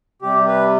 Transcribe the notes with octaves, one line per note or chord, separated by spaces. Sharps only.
C3 G3 G4
B4